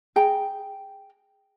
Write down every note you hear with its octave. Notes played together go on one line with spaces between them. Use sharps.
G#4 G5 A#5